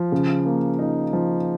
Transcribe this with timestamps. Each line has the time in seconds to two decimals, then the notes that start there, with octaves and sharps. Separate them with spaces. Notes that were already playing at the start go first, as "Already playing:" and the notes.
Already playing: F3
0.12 C#3
0.46 A#3
0.79 D#4
1.13 F3